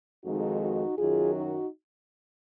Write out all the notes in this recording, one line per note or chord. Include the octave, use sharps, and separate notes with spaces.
F2 D#3 G#3 D#4 F#4
D#4 F#4
F#2 D#3 F#3 F4 G#4
D#4 F#4